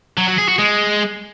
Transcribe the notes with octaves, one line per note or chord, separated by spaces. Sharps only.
F#3
F#3
G#4
F#4
G#3